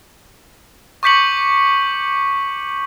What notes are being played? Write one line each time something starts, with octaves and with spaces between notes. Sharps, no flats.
C#6 D6 G6 B6 C#7 F#7